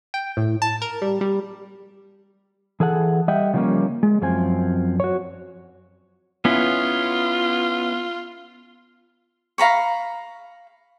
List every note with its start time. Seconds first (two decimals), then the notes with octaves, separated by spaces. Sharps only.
0.14 G5
0.37 A2
0.62 A5
0.82 A#4
1.02 G3
1.21 G3
2.80 E3 G#4 A4 F#5
3.28 G3 D#5 E5 F#5 G5
3.53 C#3 F3 G3 A3 A#3 C#4
4.03 G#3
4.22 F#2 F3 C4 G#5
5.00 F#4 C#5
6.45 B3 C#4 E4 F4
9.58 F5 A#5 B5 C#6